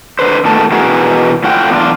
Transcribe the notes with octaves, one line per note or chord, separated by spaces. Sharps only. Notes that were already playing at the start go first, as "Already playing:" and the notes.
D3 B4 C5
A#2 D#3 A3 B3 A5
B2 E3 B3 F#4 G#4 A#4
A2 F4 F#5 G5
E2 D4 E4 F4